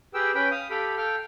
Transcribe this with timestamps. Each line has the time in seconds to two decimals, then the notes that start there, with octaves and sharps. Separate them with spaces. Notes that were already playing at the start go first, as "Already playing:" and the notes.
0.14 G4 G#4 B4 G5 E6
0.35 C#4 B4 G5 B5
0.51 F5 D#6
0.70 G4 A4 F5 G5 B5
0.98 A4 F5 G5 F6